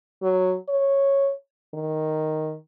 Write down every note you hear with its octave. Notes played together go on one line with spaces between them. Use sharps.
F#3
C#5
D#3